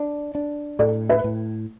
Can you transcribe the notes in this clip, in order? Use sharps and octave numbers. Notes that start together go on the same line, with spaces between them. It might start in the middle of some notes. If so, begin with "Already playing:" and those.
Already playing: D4
D4
A2 A4 D5
B4 E5
A2